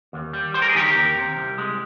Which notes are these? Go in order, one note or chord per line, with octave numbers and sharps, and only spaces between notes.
D#2
G3
G3 C5
A#4
G#4
D#3 G4 A#4
G4 A#4
D#2
C3
C2
G#3